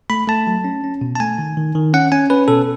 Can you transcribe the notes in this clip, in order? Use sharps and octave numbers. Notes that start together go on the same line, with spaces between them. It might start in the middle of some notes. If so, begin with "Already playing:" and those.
A3 B5
A3 A5
F#3
C#4
C#4
B2
A5
A3 G#5
D#3
D#3
D#3
C#4 F#5
C#4 G#5
C#4 B4
B2 A4